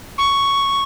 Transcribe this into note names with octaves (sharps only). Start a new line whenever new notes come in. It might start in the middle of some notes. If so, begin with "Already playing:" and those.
C#6